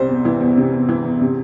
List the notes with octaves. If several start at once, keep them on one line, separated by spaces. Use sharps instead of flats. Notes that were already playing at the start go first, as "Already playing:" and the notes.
Already playing: C2 C3 C5
E2
E3
E2
C3
E2
E3
E2
C3